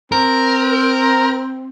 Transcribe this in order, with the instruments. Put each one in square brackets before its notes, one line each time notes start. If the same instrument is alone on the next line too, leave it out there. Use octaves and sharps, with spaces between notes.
[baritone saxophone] C4 [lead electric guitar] A#4